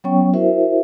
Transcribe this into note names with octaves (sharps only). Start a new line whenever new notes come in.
F#3 B3 C#4 C#5 G5 C#6
E4 F#4 A#4 C5 E5